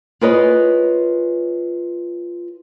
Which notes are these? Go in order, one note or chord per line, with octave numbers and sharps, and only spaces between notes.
F4 G#4 A#4 B4 C#5 D#5